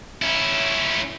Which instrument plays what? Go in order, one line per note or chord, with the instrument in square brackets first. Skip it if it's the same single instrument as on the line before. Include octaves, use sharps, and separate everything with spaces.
[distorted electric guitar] C#4 E4